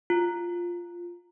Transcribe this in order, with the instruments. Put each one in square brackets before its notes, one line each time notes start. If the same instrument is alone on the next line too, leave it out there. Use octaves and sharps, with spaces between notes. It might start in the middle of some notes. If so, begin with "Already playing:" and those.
[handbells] F4